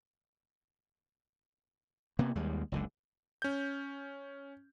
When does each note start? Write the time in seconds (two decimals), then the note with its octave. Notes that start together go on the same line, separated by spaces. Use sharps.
2.19 C3 A#3 B3
2.36 D#2 G3 G#3
2.72 F#1 C#2 D3
3.42 C#4 G6